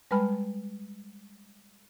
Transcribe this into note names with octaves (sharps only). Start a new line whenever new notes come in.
G3 G#3 B4 A5 B5 F6